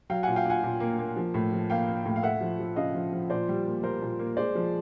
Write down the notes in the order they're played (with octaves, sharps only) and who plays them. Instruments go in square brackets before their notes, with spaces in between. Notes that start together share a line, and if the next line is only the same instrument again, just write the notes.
[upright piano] F#3 F5 G5
A#2 F#5 G#5
F5 G5
A#2 F#5 G#5
A#2
A#3
A#3
F3
A2
F3
A#3 F5 G5
A#3
A2
F5
A3 E5 F#5
F3
F3
C#3 D#5 F5
F3
F3
A#2 C5 D5
G3
A#3
G3 A#4 C5
A#2
A#3
G#3 C5 D5
F3